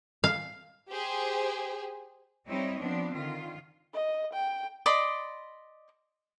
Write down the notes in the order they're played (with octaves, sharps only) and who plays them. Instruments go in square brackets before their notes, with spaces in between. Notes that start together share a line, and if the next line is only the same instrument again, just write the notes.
[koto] F5
[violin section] G4 G#4 C5
[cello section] G3 C4 D#4 E4 C#5 D#5
F3 B3 C4 D4
D3 D#3 F4
[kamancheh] D#5
G5
[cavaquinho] D5 D#5 B5 C6